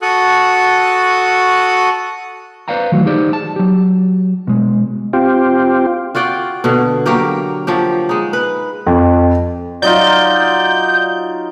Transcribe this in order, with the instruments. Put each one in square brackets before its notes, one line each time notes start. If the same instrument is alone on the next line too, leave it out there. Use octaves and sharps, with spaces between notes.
[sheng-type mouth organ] F#4 A4 C#6 D#6 F#6
[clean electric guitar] B4 C5 D5 F5 G5 A#5
D#3 E3 F#3 A3 F#4
D#4 G4 G#4 C5 D5
A5
F#3 G4
B2 G#3
[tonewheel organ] C4 F4 G4
[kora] F4 F#4 D5 G5
B2 D3
F#3 A#3 G4 A#4
F3 F#3 G4
G#3 D#4
B4
[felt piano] F2
[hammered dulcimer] F#3 D#4 F4 [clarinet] D5 [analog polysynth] G6